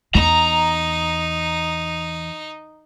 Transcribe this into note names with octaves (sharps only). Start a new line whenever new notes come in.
E2 D#4 A#5